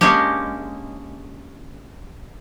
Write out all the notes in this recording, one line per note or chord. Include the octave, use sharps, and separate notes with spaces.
G#3 A#3 C#4 D4 G4